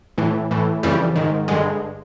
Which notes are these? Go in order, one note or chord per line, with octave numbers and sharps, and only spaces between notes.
A2 E3
A2 E3
F2 C#3 E3 G3
G#2 D#3
G2 D3 G#3